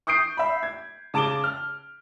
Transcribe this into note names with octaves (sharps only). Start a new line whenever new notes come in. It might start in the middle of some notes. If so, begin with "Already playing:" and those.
C#6 D#6 G6 C7 D7
E5 B5
G#6
C#3 A5 D6 D7 G7
F6